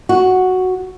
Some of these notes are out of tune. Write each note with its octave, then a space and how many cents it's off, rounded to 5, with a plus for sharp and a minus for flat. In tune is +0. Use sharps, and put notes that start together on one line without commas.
F#4 +0